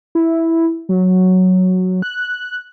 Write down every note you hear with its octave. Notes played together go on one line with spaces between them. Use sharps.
E4
F#3
F#6